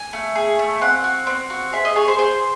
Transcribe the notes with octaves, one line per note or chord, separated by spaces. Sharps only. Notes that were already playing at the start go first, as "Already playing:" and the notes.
Already playing: G#5
A3
G#4
A3
C4 F#5
F#4
C4
F#4
G#4 E5
D#5
G#4 C#5
C5
G#4 C5